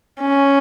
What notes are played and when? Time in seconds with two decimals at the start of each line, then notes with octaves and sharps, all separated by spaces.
0.21 C#4